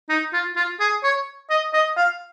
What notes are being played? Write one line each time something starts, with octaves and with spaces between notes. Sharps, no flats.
D#4
F4
F4
G#4
C#5
D#5
D#5
F5